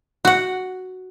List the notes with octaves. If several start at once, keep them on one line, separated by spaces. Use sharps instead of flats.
F#4 F#5